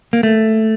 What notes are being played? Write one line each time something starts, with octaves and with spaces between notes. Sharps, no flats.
A#3
A3